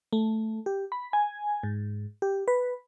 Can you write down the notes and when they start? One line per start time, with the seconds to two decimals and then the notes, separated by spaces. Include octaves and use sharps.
0.13 A3
0.66 G4
0.92 B5
1.13 G#5
1.63 G#2
2.22 G4
2.48 B4